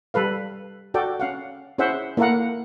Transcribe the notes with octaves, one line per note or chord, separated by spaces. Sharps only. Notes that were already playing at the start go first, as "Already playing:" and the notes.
G3 A4 B4 F5
F#4 A4 D5 G5
C#4 F5 F#5
C#4 E4 G#4 C5 E5 F#5
A#3 E4 A4 A#4 F5 F#5